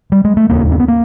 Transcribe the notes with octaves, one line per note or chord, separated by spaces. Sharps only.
G3
G#3
A3
E1 D#2 C#3 A#3
C4
B3
A#3